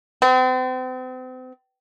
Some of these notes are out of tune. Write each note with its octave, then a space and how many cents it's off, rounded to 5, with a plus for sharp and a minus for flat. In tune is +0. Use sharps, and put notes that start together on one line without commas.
C4 -40